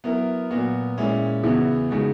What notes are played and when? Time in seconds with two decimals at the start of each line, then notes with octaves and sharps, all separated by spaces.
0.04 F#3 B3 E4 A#4
0.51 A#2 F#3 B3 F#4
0.98 A#2 G#3 C#4 E4
1.43 E2 C#3 E3 B3 F#4
1.90 C#3 G#3 D#4 F#4